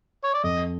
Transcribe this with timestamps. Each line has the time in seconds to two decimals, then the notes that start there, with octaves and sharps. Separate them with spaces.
0.24 C#5
0.34 D5
0.44 F2 D#5